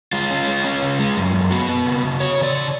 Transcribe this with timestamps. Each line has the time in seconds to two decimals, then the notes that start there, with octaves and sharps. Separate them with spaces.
0.13 G#3 F4
0.31 C#4
0.47 G#3
0.64 C#4
0.82 C#3
0.99 G#3
1.16 F#2
1.34 F#2
1.51 B3 F#4
1.69 B3
1.86 C#3
2.03 C#3
2.20 C#3 C#5
2.38 C#3
2.43 D5
2.55 C#3